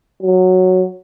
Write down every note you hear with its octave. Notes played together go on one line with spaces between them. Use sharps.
F#3